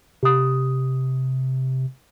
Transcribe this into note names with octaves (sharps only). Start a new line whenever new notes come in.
C3 G4 D#6